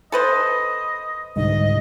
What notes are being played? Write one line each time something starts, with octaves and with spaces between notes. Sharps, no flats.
A4 B4 C5 D#5
C2 G#2 D3 D#5